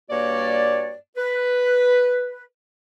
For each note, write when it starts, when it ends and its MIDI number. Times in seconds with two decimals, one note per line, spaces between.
0.10 0.93 43
0.10 0.93 58
0.10 0.93 66
0.10 0.93 73
0.10 0.93 74
1.18 2.43 71